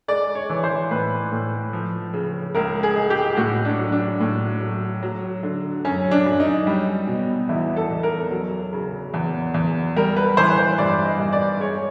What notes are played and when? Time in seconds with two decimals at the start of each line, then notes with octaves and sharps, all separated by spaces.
0.08 G#3 D5
0.35 C#5
0.50 E3
0.64 C5
0.91 A2 B4
1.32 A2
1.73 F3
2.14 C#3
2.55 C#2 A#4
2.83 G#4
2.96 G#3
3.10 G4
3.37 A2 F#4
3.65 D4
3.79 F#3
3.92 D4
4.20 A2
4.61 F#3
5.03 F#3
5.43 D3
5.85 F#2 C#4
6.11 D4
6.25 F#2
6.40 D#4
6.67 G3
7.07 B2
7.49 E2 E4
7.76 A4
7.90 E2
8.03 A#4
8.31 F#3
8.73 C#3
9.14 E2
9.54 E2
9.96 G3 A#4
10.16 B4
10.37 E3 C5
10.58 C5
10.78 G2 D5
11.05 D#5
11.19 G2
11.33 D5
11.60 G#3 C#5